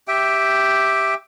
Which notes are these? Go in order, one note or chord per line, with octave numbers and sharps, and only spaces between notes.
G4 E5 G5